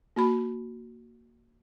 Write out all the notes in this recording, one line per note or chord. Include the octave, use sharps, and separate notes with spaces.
A#3 F#4 B5